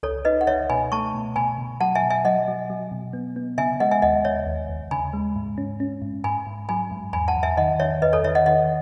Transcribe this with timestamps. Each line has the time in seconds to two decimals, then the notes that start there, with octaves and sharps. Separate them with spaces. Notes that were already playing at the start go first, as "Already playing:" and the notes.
0.03 C#2 A4 C#5
0.25 D#4 B4 D#5
0.41 F#5
0.47 C#2 C#5 E5
0.70 B2 G#5 B5
0.92 A3 A5 C#6
1.14 B2
1.36 B2 G#5 B5
1.58 B2
1.81 F#3 F#5 A5
1.95 E5 G#5
2.02 B2
2.10 E5 G#5
2.25 F#3 D#5 F#5
2.48 F#3
2.70 F#3
2.91 B2
3.13 B3
3.36 B3
3.58 C#3 E5 G#5
3.80 G#3 D#5 F#5
3.91 E5 G#5
4.02 D#2 D#5 F#5
4.24 C#3 C#5 E5
4.46 D#2
4.69 D#2
4.91 C#3 G#5 B5
5.13 G#3
5.36 G#2
5.58 C#4
5.80 C#4
6.02 G#2
6.24 G#2 G#5 B5
6.47 G#2
6.69 F#3 G#5 B5
6.91 G#2
7.13 E2 G#5 B5
7.28 F#5 A5
7.36 E2
7.43 E5 G#5
7.57 D#3 D#5 F#5
7.80 D#3 C#5 E5
8.02 E2 B4 D#5
8.13 A4 C#5
8.24 D#3 C#5 E5
8.35 D#5 F#5
8.46 D#3 D#5 F#5